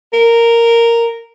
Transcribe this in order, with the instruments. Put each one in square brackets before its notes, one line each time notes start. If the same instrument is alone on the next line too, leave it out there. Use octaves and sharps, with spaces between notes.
[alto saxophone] A#4